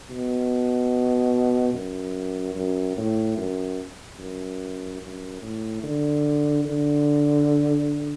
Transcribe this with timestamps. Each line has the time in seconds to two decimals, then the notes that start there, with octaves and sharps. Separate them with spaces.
0.10 B2
1.74 F#2
2.55 F#2
2.97 A2
3.37 F#2
4.19 F#2
5.01 F#2
5.42 A2
5.83 D3
6.65 D3